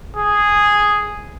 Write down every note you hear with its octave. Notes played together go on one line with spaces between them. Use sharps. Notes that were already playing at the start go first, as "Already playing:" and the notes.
G#4